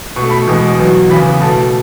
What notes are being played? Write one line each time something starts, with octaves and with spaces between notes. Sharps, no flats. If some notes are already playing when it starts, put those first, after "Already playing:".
B2 A3 C#6
B5
C#6
E2 B2 G#3 B3
E2 B2 F#3
E2 C#3 E3 B3 B5
B2 A3 A5